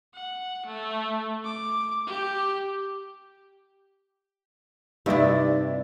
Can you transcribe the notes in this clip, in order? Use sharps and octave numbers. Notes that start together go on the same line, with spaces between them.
F#5
A3
D6
G4
G2 C3 D#4 E4 D5